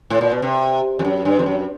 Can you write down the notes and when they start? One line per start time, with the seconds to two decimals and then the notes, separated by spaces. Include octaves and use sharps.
0.10 A2
0.21 A#2
0.32 B2
0.42 C3
0.99 F2
1.05 F#2
1.25 G2
1.39 F2
1.46 F#2